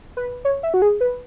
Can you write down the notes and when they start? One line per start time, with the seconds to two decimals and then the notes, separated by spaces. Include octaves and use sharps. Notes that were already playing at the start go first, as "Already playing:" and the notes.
0.17 B4
0.45 C#5
0.63 E5
0.74 F#4
0.82 G#4
1.01 B4